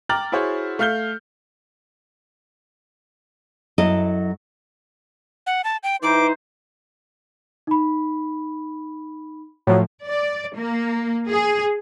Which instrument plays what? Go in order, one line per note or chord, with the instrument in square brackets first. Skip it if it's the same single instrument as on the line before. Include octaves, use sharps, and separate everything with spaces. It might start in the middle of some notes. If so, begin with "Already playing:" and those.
[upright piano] G5 A#5 D6 F6 A6 F#7
E4 F#4 G#4 C5 C#5
A3 F5 F6 G6 G7
[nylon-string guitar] F#2 F#3 E4 A4 D#5
[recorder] F#5
A5
G5
[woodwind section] E3 D#4 C5 [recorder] D6
[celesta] D#4 B5
[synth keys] A2 F3 [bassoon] F#3
[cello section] D5
A#3
G#4